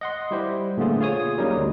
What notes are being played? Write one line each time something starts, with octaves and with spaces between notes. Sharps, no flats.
D#5 F#5 C6
G3 E4 G4 C5
A#2 D3 A3 B3 F4 G#4
F4 G#4 C#5 D#6
F#3 G3 A#3 C#4 D#4 G#4
D2